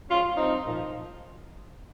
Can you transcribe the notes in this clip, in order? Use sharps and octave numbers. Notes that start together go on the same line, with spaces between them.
G#2 F3 C#4 F4
G2 F3 C4 D#4
A#2
F3